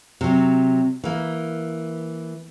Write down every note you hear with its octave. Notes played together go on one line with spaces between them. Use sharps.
C3 F#3
E3 A#3